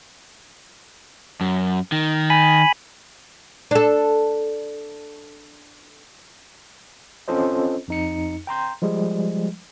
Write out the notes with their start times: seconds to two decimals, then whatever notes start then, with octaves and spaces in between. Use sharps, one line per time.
1.41 F#2
1.92 D#3
2.30 G#5 B5
3.71 D4 A4
7.28 C4 C#4 F4 A4 C5 D#5
7.88 F2 D#4 C#7
8.47 G5 A#5 C6 G6
8.82 F3 G3 G#3